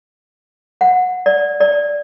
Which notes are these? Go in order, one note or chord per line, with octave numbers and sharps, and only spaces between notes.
F#5
D5
D5